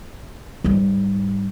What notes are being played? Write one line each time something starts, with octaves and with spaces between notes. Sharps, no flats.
G#2 G3